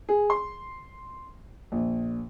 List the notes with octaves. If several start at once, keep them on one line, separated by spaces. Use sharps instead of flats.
G#4
C6
A#1